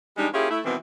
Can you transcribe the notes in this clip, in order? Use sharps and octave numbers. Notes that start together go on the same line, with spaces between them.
E3 G3 G#3 B3 D4 D#4
A#3 C#4 E4 F4 G4 G#4
A3 E4
B2 D#3 E3 G3 B3 C4